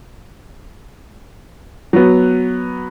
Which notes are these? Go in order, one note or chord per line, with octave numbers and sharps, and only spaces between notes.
F#3 B3